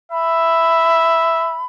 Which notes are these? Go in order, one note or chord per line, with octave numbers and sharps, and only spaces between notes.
E5 B5